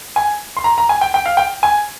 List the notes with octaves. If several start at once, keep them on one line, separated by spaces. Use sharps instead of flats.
G#5
C6
A#5
A#5
G#5
G5
G5
F5
G5
G#5